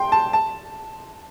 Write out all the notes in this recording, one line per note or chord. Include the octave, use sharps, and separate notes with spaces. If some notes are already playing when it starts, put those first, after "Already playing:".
Already playing: G5 C6
A5
A5